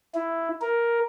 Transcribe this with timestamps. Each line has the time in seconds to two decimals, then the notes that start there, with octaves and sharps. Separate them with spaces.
0.15 E4
0.62 A#4